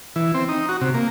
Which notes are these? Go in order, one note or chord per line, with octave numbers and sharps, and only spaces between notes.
E3
C4
D#4
F#4
C3
A#3